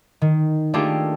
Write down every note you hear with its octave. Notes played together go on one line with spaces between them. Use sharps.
D#3
A3 A#3 D4 F4 G4 G#4